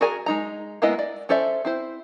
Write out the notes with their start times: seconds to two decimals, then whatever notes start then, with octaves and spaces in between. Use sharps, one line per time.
0.01 F#4 G#4 A#4 D5 G#5
0.26 G#3 D#4 A#5
0.82 G#3 A#3 B3 E4 D#5
0.99 D5
1.29 C#4 A4 C5 D5 E5
1.65 C4 E4 C5